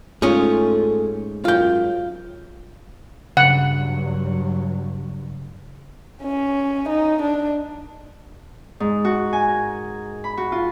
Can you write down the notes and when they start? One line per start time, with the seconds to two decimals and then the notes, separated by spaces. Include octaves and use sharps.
0.22 G#2 A3 C#4 F4 G#4
1.45 F#2 F4 G5
3.37 G2 C#3 F#3 F#5
6.23 C#4
6.89 D#4
7.22 D4
8.80 G#2
9.05 F#4
9.33 G#5
9.49 A#4
10.24 B5
10.37 F#4
10.52 F4